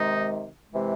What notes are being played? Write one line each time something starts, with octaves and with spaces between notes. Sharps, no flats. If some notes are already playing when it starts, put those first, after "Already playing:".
Already playing: C3 D#3 G#3 D#4
C3 E3 G#3